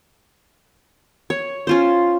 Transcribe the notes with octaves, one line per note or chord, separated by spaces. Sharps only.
C#5
C#4 F4 C5